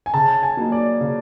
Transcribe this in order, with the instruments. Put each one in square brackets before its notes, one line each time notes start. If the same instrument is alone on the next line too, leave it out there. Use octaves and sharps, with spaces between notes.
[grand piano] G#5
[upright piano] C#3 [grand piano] A5
[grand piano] G#5
[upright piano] F#3 A#3 D#4
[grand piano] D5
[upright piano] C#3